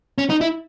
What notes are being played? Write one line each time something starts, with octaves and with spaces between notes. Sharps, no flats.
C#4
D#4
E4